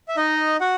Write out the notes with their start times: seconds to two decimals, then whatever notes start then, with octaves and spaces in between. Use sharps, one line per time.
0.08 E5
0.17 D#4 D#5
0.60 F#4 F#5